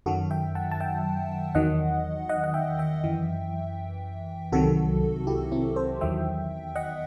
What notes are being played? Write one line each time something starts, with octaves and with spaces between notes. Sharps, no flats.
F#2 D#3 F#3 F#4 A4
E5 G5
F#5 A5
A5
E5 G5
E2 D#3 F#3 D#5 F#5
D#5 F#5
F#5
E5 G5
E5 G5
F#2 E3
C2 C3 D#3 F#3 F#4 A4
E4 G4
C4 E4
A4 C5
E2 D#3 F#3 E5 G5
D#5 F#5